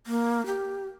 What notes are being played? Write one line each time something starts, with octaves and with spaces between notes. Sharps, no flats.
A#3
G4